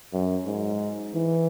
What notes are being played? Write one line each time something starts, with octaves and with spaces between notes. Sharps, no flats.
F#2
G#2
E3